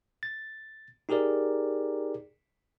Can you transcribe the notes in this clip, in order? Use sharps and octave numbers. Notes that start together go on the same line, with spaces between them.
A6
D#4 G4 G#4 A#4 D5